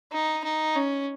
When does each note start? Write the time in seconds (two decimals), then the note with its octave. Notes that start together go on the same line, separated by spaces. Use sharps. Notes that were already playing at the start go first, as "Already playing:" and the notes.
0.12 D#4
0.44 D#4
0.75 C#4